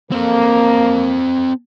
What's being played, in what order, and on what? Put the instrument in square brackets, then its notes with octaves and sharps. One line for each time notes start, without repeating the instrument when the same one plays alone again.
[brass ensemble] A#3 [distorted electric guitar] C4 A4